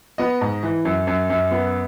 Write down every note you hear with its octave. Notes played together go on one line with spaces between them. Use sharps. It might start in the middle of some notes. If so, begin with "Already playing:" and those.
B3 D#5
G#2
E3
F#2
F#2
F#2
B3